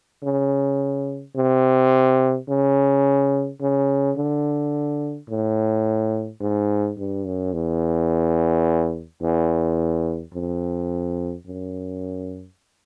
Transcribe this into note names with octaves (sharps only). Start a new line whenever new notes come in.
C#3
C3
C#3
C#3
D3
A2
G#2
G2
F#2
E2
E2
F2
F#2